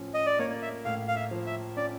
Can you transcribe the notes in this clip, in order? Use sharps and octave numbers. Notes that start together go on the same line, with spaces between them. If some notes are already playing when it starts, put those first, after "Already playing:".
Already playing: A2 F3 C#4
D#5
D5
A#3 C#5
E5
A2 F5
F5
E5
F3
E5
C#4 D5